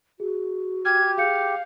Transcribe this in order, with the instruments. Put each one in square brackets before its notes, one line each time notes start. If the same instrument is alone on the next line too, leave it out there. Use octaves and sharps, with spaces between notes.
[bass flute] F#4 [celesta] G#4
[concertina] G4 [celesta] F6 [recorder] G#6
[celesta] G#4 G6 C#7 [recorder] F5